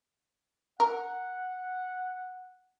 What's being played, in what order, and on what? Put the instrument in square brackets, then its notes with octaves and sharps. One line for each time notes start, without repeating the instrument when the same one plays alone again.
[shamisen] A#4 [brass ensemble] F#5